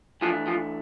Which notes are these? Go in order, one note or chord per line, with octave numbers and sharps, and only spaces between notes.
E3 F3 A3 D4 F4
F3 F4